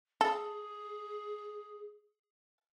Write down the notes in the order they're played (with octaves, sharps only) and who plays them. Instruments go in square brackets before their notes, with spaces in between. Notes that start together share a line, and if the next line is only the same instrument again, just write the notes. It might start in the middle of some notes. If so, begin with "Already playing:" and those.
[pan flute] G#4 [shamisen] A4